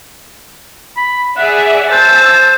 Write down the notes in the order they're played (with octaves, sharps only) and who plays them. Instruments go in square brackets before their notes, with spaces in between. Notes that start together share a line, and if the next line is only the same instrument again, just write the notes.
[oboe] B5
[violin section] G#4 D5 E5 [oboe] F#5
[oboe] C5 [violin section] A5 E6 A6